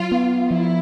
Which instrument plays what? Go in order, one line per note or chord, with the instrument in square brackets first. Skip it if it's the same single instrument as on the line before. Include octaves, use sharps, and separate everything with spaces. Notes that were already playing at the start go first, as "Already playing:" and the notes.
Already playing: [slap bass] F#3 [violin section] F4
[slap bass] B3
[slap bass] F3 [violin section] E4